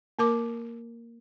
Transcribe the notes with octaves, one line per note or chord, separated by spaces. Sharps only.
A#3 A#4 D6